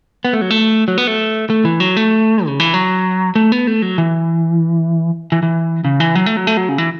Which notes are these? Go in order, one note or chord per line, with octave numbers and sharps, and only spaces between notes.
B3
A3
F#3
A3
F#3
B3
A3
A3
E3
F#3
A3
C#3
E3
F#3
A3
B3
A3
F#3
E3
E3
E3
C#3
E3
F#3
A3
F#3
A3
F#3
C#3
E3